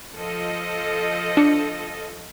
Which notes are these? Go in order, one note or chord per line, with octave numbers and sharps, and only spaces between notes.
F3 A4 D#5
D4 C#7